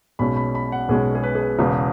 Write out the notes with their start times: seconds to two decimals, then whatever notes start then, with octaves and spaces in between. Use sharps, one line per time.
0.19 B1 B2 G#3 C#4 B5
0.36 B5
0.55 B5
0.72 F#5
0.89 B1 B2 G#3 C#4 G#4
1.15 G#4
1.23 B4
1.35 G#4
1.42 B4
1.59 E1 E2 C#3